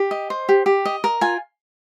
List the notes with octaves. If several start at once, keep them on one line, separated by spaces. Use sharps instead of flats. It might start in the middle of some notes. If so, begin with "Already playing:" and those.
Already playing: G4
D#5
C5
G4
G4
D#5
A#4
F4 G#5